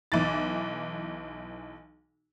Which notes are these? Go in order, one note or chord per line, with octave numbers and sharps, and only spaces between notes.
B1 E3 A6